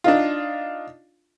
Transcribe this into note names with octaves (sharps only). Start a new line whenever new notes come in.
D4 D#4 F4